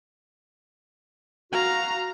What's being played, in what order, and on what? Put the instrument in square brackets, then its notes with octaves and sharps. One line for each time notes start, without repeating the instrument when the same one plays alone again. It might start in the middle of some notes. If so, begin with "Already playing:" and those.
[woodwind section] F#4 [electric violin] F5 A#5